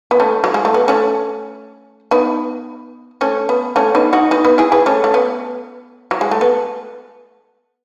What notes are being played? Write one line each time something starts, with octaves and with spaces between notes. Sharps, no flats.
B3
A3 C#4
F#3
G#3
A3
B3
A3 C#4
B3 D#4
A3 C#4
B3
A3 C#4
B3 D#4
D#4 F#4
B3 D#4
B3
E4 G#4
G#4 B4
A3 C#4
A3
B3
F#3
G#3
A3
B3